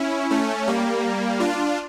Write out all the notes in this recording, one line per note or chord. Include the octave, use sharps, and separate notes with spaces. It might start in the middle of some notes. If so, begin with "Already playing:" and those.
Already playing: C#4 E4
A3 C#4
G3 A#3
D4 F4